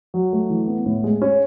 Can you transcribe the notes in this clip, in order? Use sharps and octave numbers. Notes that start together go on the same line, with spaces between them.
F#3
A3
E3
B3
A2
G#3
C#4